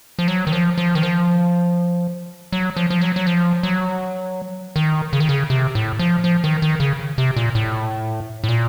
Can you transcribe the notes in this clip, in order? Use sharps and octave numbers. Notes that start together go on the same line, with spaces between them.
F3
F#3
D#3
F3
F3
D#3
F3
F#3
F3
F3
F#3
F#3
F3
F#3
D#3
C#3
D#3
C#3
C3
A2
F3
F3
D#3
D#3
C#3
C3
A#2
A2
A2
A#2